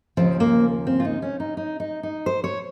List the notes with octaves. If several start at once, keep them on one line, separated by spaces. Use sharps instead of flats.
D#2 C#3 F3 C4
A#3
C4
F4
D#4
C#4
D#4
D#4
D#4
D#4
C5
C#5